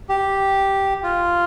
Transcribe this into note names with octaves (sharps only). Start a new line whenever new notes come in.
G4
F4